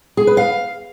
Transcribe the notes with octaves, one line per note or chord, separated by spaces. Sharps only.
G#4
B4
F5